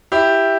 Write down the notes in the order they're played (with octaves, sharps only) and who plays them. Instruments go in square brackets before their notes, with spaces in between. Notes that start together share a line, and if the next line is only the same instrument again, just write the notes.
[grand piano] E4 G4